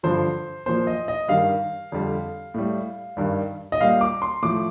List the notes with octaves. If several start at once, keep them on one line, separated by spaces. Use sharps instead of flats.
G2 D3 F3 C5
A#2 F3 C5
D#5
D#5
G2 D#3 G3 F5
F2 D3 G3
A2 G3
G2 D#3 G3
D#5
A#2 G3 F5
D6
C6
A2 F3 D6